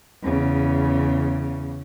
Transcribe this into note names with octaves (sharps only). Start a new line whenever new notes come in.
E2 C#3